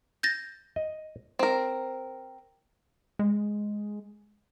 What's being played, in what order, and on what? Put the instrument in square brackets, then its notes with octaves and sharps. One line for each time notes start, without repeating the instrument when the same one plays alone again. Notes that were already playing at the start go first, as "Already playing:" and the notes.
[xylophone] G6 A6 A#6
[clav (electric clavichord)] D#5
[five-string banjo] C4 A#4
[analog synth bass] G#3